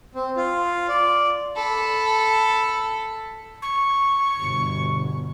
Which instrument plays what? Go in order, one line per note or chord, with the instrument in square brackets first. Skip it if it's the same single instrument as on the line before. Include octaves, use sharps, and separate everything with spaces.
[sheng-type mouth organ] C4
F4
D5
[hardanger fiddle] A4 B5
[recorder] C#6
[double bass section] G1 B2